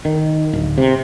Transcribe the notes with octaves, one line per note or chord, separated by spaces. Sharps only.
D#3
D1
C3